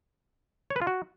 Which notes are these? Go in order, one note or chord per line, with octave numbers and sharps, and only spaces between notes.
C#5
B4
F4
F#4